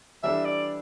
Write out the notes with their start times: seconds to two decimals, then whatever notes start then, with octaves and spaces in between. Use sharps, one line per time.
0.23 E3 G3 D4 A4 E5
0.45 D5